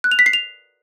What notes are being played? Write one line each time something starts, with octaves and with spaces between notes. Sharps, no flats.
F#6
F7
B6
C7
F7